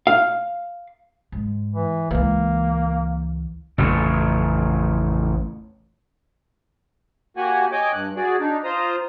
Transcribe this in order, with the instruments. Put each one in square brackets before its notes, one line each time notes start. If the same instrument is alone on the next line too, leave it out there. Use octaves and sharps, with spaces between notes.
[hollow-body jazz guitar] F5
[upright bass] G#2
[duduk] E3
[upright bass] C#2 E3 [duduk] A#3
[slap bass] A1 F2 C#3
[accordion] A#3 F#4 G4 F#5 G#5
C#5 D#5 G5 G#5 D6
G2 F#6
F#4 G#4 D5
D4 D#4
F4 C5 A#5 D#6